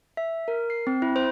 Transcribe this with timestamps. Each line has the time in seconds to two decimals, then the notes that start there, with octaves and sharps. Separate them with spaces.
0.17 E5
0.48 A#4
0.70 C7
0.87 C4
1.02 E4
1.16 C5